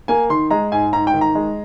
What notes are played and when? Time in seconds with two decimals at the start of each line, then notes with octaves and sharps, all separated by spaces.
0.08 A#3 G#5
0.30 D#3 C6
0.51 G#3 A#5
0.72 G#2 G#5
0.93 G#2 A#5
1.07 G5
1.14 D#3
1.21 A#5
1.35 G#3